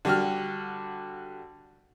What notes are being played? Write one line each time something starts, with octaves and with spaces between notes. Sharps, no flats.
D3 G3 F#4 G4 F6